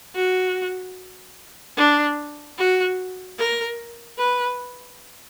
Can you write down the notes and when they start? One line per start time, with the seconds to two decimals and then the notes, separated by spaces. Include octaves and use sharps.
0.15 F#4
1.77 D4
2.58 F#4
3.39 A#4
4.18 B4